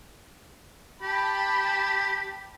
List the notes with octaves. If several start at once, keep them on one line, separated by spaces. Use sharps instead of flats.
G4 G5 A5 B5